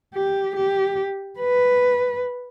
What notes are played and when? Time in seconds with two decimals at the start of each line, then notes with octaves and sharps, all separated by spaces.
0.14 G4
0.56 G4
1.39 B4